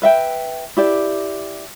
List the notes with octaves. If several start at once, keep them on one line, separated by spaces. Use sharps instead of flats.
B4 E5 G5
E4 G4 D5